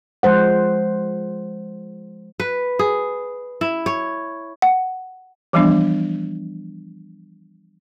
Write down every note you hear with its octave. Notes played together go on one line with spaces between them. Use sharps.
F3 G#3 C5 F#5
B4
G#4
E4
C#5
F#5
E3 F3 G3 B3 D4